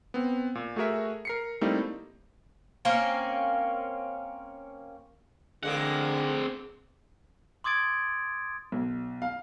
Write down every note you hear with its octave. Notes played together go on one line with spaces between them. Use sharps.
B3 C4
A#2
A3 F#4 G#4 A#4 E5
A#4 C7 C#7
G3 A3 A#3 C4 D#4 E4
A#3 C4 C#4
D3 G#3 A#3 C4 F#5
C6 D6 D#6 G#6 A6 D7
B1
F5